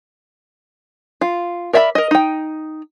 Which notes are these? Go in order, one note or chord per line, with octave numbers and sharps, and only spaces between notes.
F4
A#4 D5 E5 F#5 B5
A#4 D#5
D#4 G5